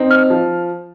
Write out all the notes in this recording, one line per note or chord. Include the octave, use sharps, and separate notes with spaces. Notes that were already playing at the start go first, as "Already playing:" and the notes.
Already playing: C4 D#4
F6
F3